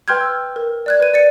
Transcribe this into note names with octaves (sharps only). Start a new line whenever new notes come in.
B4 G5 C6 F6 G6 G#6
E6
A#4
D5 F#6 G#6
B4 D#7
D5 A6 C#7